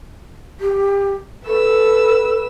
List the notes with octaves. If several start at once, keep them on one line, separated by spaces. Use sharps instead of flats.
G4
A4 B4 E6